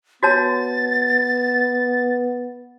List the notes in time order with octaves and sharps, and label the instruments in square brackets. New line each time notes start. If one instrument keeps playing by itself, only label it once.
[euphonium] B3 [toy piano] F#4 C#5 A5 [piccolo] A6